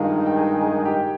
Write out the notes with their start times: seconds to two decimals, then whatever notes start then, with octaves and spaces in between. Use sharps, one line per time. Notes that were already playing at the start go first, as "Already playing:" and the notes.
Already playing: G2 D#3 G#3 D#4 F4 A#4 F5
0.11 F4 F5
0.26 G5
0.36 G#4 G#5
0.61 G#4 G#5
0.85 G4 G5